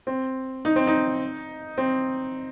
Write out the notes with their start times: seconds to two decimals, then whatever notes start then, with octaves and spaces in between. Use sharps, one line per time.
0.07 C4
0.65 D#4
0.76 C4
0.87 D#4
1.78 C4